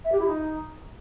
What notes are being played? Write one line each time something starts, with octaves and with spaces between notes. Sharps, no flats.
E5
G4
E4
D#4